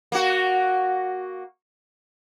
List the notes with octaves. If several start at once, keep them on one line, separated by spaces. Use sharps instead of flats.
A#3 F#4